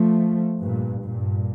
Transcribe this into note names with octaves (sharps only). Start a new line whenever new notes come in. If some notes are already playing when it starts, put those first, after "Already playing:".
Already playing: F3 A3
G2 A#2
G2 A#2